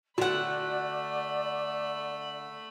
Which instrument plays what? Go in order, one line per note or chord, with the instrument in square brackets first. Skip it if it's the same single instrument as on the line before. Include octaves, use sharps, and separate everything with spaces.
[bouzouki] D3 F#5 [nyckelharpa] A3 B5 [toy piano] F#4 [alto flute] D5